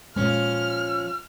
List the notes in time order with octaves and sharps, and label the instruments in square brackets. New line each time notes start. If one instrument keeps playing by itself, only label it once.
[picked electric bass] A#2 G#3 [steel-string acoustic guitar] F3 C#4 [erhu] F6